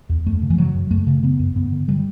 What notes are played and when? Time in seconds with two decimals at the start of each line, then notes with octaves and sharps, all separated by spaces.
0.09 E2
0.26 F#2 A3
0.42 C#3
0.50 E3
0.58 C#3 F#3
0.75 F#2
0.91 F#2 A3
1.07 C#3
1.23 C#3 B3
1.39 F#2
1.56 G2 B3
1.72 D3
1.88 D3 G3